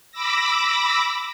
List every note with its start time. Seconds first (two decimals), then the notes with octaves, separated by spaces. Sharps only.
0.12 B5 D6 E6 A#6